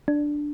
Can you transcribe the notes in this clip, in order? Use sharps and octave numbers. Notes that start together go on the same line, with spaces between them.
D4